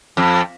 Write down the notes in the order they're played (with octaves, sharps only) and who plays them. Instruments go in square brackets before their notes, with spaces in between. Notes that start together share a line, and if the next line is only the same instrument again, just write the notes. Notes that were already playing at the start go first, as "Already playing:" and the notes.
[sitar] F2